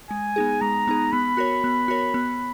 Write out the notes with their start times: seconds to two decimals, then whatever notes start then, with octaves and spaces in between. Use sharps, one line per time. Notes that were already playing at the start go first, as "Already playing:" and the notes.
0.10 G#3 G#5
0.36 B3 D#4 G#4
0.61 G#3 A#5
0.87 B3 D#4 G#4
1.12 B3 B5
1.37 F#4 A#4 C#5
1.64 B3
1.88 F#4 A#4 C#5
2.14 B3